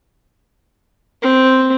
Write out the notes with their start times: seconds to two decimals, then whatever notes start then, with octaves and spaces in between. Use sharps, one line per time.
1.22 C4